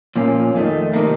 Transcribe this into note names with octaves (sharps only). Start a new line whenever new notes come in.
A#2 F3 A#3 C#4 F4
F2 D#3 A3
C3 D#3 A#3